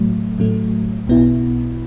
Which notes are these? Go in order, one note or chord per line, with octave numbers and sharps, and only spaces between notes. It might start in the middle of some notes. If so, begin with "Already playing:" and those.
Already playing: A2 F#3 A3
A2 F#3 A3
B1 B2 B3 E4